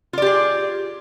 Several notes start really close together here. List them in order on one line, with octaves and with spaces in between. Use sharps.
F4 D5 G4 G#4